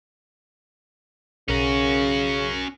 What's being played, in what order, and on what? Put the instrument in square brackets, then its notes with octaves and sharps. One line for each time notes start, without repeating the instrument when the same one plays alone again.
[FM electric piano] B1 A#4 A#6 [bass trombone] C#3 [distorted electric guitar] C#4 F#4